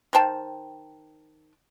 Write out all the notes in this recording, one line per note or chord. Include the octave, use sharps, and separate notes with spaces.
D#3 C5 G5 A5